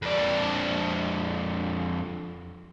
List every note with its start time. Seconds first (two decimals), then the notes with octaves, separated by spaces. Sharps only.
0.02 F2 D4